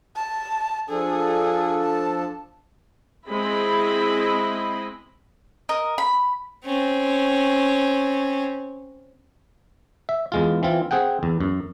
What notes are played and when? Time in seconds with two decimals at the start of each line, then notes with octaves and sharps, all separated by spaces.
0.16 A5
0.90 F3 D4 G#4 A4
1.83 A5
3.28 G#3 C4 E4 D#5 B5
5.69 A#4 D#5
5.98 B5
6.65 C4 C#4
10.09 E5
10.32 E2 G#3 F4
10.63 E3 C4 F4
10.91 C4 G#4 F#5 G5
11.23 E2
11.40 F#2